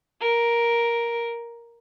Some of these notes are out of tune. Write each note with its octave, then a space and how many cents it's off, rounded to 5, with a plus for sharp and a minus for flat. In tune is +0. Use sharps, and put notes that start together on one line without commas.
A#4 +5